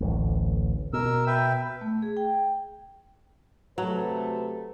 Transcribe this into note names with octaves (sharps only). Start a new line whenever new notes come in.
D1 A1
B2 A#4 E6
B4 E5 G5
A3
G#4
G5
C3 F#3 A3 B4